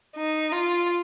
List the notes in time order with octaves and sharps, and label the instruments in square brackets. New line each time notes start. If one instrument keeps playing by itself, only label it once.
[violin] D#4
F4